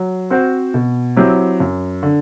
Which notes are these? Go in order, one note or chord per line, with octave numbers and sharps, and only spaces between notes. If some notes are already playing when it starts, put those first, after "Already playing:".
Already playing: F#3
C4 F#4 C5
B2
F#3 C4 E4 G4
F#2
D3